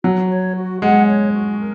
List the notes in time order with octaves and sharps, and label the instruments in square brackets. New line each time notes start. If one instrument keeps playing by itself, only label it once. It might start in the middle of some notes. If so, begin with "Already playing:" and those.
[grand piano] F#3 [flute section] F#4
[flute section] C#5
F#4
[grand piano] G#3 [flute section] F#5
[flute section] C#5
F#4
A#4